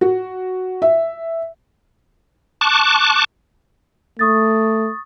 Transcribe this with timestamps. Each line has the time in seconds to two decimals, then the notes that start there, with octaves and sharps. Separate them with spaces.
0.01 F#4
0.82 E5
2.61 A5 C#6 D6 F#6
4.19 A3 C#6 D#6 A6